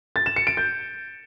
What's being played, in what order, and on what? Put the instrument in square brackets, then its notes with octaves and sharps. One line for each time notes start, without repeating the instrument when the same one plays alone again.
[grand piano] A6
E7
C#7
D7
G6